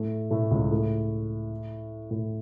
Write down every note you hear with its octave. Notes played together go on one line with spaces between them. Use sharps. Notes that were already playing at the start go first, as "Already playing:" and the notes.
Already playing: A2 A3
A2 A3
C#2 C#3
A2
A2